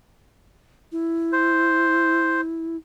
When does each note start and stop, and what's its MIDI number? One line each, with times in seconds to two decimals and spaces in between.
0.92 2.76 64
1.33 2.41 72